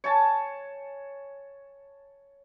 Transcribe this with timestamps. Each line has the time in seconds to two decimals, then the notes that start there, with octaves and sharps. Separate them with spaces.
0.04 C#5 G#5 A5